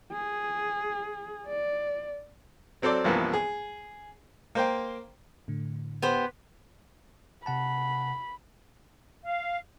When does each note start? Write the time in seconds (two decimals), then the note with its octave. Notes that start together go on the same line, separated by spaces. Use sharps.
0.13 G#4
1.47 D5
2.82 F#3 C4 A4 C5 D5
3.04 C2 G2 E3 F3 A#3 B3
3.33 G#4
4.55 A#3 C5 G5
5.48 A2 D3
6.02 B3 G4 C5
7.46 C3 F#5 A5 B5
9.25 F5